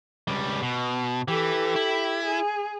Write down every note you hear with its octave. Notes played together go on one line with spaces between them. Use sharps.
C#2 G3
B2
E3 G4 A4
E4
G#4